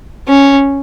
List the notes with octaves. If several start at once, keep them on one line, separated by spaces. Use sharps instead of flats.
C#4